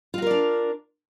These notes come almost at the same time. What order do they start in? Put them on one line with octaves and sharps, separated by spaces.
F4 F#4 A#4 D5 D4